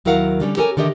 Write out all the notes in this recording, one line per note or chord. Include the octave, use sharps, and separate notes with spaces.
D#2 F#3 E4 A#4 F5 F#5
D3 G3 C#4
C#4 G4 A4 A#4 C#5 G#5
D3 D#3 G4 D#5 E5